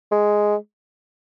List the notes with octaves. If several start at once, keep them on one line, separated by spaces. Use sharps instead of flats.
G#3